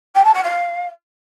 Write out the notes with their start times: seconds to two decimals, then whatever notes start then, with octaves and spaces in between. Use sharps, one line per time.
0.15 G5
0.24 A5
0.34 F#5
0.43 F5